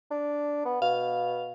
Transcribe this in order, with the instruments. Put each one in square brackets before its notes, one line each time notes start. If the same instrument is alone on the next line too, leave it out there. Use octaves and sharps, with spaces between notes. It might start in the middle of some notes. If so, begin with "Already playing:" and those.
[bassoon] D4
B3
[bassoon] B2 [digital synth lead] F5